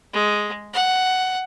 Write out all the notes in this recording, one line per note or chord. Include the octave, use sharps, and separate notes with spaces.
G#3
F#5